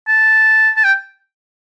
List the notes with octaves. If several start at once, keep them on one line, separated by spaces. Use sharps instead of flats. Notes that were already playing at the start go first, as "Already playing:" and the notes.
A5
A5
G5